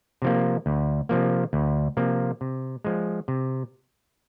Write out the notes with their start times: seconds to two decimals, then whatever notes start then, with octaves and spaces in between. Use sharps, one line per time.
0.22 C3 F3 A#3
0.66 D2
1.09 C3 F3 A#3
1.53 D2
1.97 C3 F3 A#3
2.41 C3
2.85 F3 G#3
3.28 C3